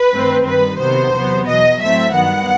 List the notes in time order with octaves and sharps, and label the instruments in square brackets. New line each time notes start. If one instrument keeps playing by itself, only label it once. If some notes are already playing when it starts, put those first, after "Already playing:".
Already playing: [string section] B4
G2 D#3 A3 C4
G2 D#3 G3 B4
C3 D#3 F#3 B3 C5
E2 C3 F#3 B3
E2 B2 F#3 D#5
A2 F#3 A3 C4 E5
G2 D#3 F#3 B3 F#5